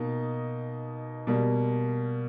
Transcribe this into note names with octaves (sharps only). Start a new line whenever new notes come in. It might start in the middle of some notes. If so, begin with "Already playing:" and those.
Already playing: B2 A#3 D#4
B2 G3 A#3